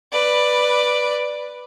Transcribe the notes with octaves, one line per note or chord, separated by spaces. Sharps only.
B4 D5